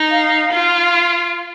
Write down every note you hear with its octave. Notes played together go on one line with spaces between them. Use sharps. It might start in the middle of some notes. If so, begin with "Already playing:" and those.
Already playing: D#4
F5
F4